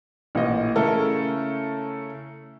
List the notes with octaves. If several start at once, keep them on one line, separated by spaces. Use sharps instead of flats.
A1 A#2 D#5
C#3 A3 C#4 E4 A4 A#4